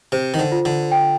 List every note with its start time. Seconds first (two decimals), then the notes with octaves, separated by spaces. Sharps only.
0.12 C3 C5
0.34 D#3
0.39 D3
0.52 F4
0.65 D3
0.92 G5